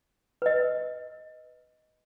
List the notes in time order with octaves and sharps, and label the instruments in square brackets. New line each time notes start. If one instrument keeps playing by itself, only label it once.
[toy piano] B4 D#5